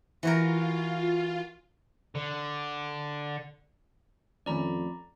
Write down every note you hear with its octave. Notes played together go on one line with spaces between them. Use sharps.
E3 F4 F#4 A#4
D3
F2 D#3 A3 C#4 D5 A#5 B5